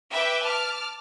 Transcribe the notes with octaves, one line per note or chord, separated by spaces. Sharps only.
B4 E5 G5 D6
A5 D6 F6